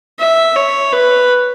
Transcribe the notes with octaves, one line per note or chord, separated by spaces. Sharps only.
E5
C#5
B4